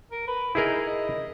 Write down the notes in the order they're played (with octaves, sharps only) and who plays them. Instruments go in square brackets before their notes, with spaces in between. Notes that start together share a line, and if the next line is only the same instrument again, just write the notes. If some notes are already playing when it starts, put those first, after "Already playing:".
[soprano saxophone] A#4
B4
[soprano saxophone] D#4 [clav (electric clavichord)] E4 G#4 A#4
[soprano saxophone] D#5